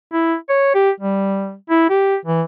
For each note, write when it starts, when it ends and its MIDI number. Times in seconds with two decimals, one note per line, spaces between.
0.13 0.36 64
0.49 0.74 73
0.75 0.91 67
1.00 1.54 55
1.70 1.88 64
1.90 2.16 67
2.25 2.43 52